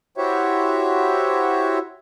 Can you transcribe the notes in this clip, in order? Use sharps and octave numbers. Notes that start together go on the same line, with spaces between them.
E4 F#4 G4 C5 C#5 E5